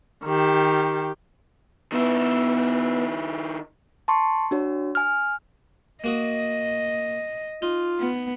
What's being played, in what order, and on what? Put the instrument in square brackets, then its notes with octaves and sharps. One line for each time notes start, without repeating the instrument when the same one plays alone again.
[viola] D#3 G4
[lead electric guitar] D#3 E4 [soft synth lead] B3
[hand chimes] A5 C6 C#6
D4 F#4 C#5
G#5 F6
[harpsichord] A#3 F#4 D#6 [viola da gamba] D#5
[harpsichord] D#4 [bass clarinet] F4
[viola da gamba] B3